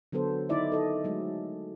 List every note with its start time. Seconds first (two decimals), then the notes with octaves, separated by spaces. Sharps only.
0.12 D3 F#3 B3 A4 C5
0.49 D#3 F#3 D#4 E4 D5 E5
0.72 A4 D#5
1.04 F#3 G#3 A3